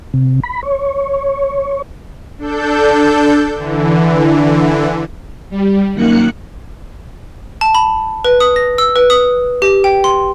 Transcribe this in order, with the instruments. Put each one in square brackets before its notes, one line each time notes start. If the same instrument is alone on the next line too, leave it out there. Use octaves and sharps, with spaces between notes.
[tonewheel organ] C3
B5
C#5
[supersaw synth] D4 A4 G6
D3 E3
[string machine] G3
F#2 D#3 A#3 F#6 C#7
[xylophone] A5
B5
B4
D#6
A#6
E6
B4
D#6
G4
G5
C6